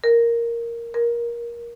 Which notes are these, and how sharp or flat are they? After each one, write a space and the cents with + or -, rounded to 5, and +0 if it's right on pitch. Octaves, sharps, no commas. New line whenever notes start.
A#4 +0
A#4 +20